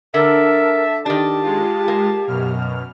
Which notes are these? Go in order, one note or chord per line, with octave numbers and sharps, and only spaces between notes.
D3 A#4 E5 A5
D#3 D4 G4 A5
G#3 F4
A#3
F#2 B2 F6